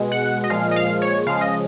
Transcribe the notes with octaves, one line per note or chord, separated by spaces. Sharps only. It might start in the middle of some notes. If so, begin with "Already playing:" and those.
Already playing: B2 G#3
F#5
D#5
A#2 F3 G#3 F5
D#5
F5
C#5
C#3 F3 G#3 F5
D#5